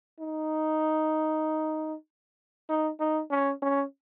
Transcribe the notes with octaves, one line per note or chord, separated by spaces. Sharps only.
D#4
D#4
D#4
C#4
C#4